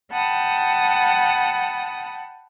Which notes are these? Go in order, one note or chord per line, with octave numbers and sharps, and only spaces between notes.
F#5 G5 A5 B5 D#6